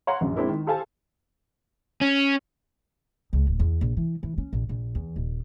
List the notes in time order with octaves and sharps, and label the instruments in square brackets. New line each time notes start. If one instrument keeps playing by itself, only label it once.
[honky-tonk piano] C#5 F5 F#5 A#5 C6
A#1 F#2
G#3 C4 D4 E4 A#4
D#3
G4 A4 C5 F5 G#5 A5
[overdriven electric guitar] C#4
[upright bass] C#2
D1
E2
A#1
E3
E3
C#4
A#1
A#1
E2
D#1